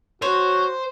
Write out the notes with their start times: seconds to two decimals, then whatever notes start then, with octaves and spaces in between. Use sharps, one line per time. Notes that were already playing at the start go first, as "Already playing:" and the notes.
0.22 F#4 C5 C#5